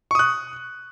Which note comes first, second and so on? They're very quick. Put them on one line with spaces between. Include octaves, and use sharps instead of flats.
C#6 D#6 F#6